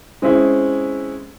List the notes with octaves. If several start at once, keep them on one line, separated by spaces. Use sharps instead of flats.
G#3 C4 C#4 E4 G#4